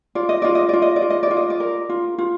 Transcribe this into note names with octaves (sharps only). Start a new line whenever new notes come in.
F4 D5
D#5
F4 D5
D#5
F4 D5
D#5
D5
F4
D#5
D5
F4
D#5
D5
A#4
F4
F4